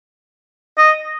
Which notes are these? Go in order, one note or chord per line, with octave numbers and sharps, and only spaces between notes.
D#5